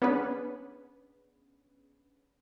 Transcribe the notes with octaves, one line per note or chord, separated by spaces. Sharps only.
B3 C#4 D4 G#4 B4